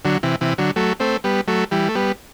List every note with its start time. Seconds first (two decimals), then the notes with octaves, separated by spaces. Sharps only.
0.05 D3 F#3
0.23 C3 E3
0.41 C3 E3
0.58 D3 F#3
0.76 F#3 A3
1.00 A3 C4
1.24 G3 B3
1.48 F#3 A3
1.71 E3 G3
1.89 A3
1.95 G3 B3